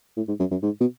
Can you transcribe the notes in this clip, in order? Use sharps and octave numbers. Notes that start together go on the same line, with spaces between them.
A2
G#2
F#2
F#2
G#2
B2